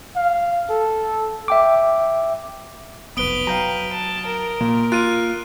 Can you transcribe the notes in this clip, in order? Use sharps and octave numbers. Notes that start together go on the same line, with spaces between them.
F5
A4
E5 G5 D6
F1 B1 B3 B4 D#6 D7 G7
F#3 F5 G5 A#5
A5
A#4
A#2 A#3
F4 F#6 D#7